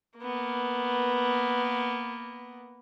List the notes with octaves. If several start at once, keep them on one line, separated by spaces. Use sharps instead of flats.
A#3 B3